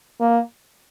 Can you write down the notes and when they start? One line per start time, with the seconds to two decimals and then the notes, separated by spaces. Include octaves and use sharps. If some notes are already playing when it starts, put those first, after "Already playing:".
0.21 A#3